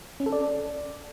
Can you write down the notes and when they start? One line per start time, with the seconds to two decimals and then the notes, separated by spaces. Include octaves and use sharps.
0.20 C#4
0.26 A4
0.32 D5